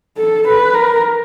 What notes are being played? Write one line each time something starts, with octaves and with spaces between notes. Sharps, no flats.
A4
B4
A#4